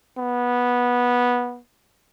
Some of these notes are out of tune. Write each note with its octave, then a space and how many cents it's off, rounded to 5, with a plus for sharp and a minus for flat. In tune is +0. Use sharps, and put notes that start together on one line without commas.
B3 -10